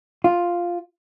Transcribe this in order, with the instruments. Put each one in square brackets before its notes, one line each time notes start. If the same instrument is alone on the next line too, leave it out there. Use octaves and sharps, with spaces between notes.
[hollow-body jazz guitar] F4